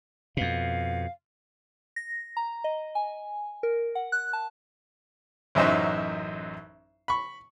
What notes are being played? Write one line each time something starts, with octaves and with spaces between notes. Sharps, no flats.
F2 B2 F5
A#6
A#5
D#5
G#5
A#4
F#5
F#6
A5
A1 F#2 F#3 D#4 C5 E5
B5 C#6